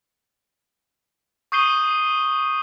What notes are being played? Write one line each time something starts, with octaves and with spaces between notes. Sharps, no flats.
C#6 D#6 G6 C7 D#7 G7